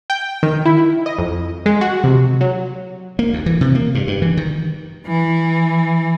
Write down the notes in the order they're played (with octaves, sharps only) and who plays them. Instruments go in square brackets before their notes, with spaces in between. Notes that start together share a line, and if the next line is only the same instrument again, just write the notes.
[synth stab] G5
D#3
E4
D#5
F2
G#3
F#4
C3
F#3
[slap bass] A#3
D2
E3
C3
A#3
G2
G2
E3
D#3
[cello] E3